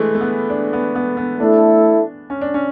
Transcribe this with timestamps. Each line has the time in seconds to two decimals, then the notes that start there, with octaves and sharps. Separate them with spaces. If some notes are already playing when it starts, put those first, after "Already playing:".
Already playing: E3 G#3 A3
0.15 A3
0.21 B3
0.50 D4
0.73 B3
0.95 B3
1.17 B3
1.40 A3 D4 E4 A4
2.30 C#4
2.41 D4
2.54 C#4